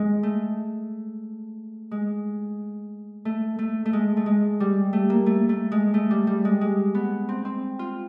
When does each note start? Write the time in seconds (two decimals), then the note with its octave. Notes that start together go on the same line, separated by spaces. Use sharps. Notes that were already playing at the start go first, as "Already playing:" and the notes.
Already playing: G#3
0.23 A3
1.91 G#3
3.25 A3
3.59 A3
3.85 A3
3.93 G#3
4.17 A3
4.26 G#3
4.60 G3
4.93 A3
5.10 A#3
5.26 A3
5.49 A3
5.72 G#3
5.94 A3
6.11 G3
6.27 G3
6.45 G#3
6.61 G#3
6.95 B3
7.29 C4
7.45 C4
7.79 F4